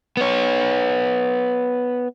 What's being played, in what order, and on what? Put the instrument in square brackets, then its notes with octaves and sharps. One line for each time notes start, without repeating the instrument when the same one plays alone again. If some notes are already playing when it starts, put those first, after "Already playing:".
[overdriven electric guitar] B3 C#5